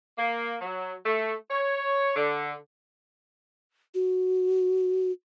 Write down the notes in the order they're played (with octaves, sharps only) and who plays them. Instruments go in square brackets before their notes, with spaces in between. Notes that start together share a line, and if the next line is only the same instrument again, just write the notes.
[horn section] A#3
F#3
A3
C#5
D3
[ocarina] F#4